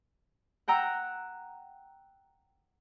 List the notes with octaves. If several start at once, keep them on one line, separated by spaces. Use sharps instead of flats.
F#5 G5 A#5 E6